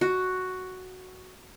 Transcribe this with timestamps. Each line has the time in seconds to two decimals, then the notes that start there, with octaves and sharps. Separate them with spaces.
0.01 F#4